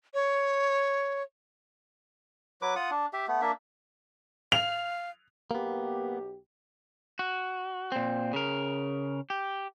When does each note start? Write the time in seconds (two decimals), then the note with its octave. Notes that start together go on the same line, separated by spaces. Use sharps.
0.14 C#5
2.62 F#3 B4 D6
2.76 F4 F#5 D#6
2.91 D4
3.13 G4 E5
3.28 A3 B3
3.42 A#3 D4 E5
4.52 F5 F7
5.51 B1 A#3 B3 G4
7.19 F#4
7.92 A#2 C4
8.33 C#3 A#4
9.30 G4